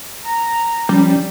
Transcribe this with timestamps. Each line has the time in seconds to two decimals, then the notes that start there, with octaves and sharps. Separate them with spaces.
0.23 A#5
0.89 F3 G3 C#4